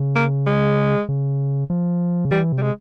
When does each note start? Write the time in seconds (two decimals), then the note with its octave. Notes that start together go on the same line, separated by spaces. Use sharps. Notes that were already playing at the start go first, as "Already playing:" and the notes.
Already playing: C#3
0.16 A#3
0.46 G#3
1.09 C#3
1.70 F3
2.25 C#3
2.31 E3 G3
2.52 C3
2.58 G3
2.62 G#3